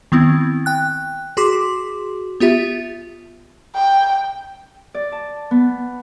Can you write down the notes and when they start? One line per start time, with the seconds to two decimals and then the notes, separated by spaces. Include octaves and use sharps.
0.12 D#3 B3 C4 E4
0.66 G5 F#6
1.37 F#4 G#4 C6 D6 B6
2.40 B3 F4 G4 E5
3.75 G5
4.94 D5
5.12 A5
5.51 B3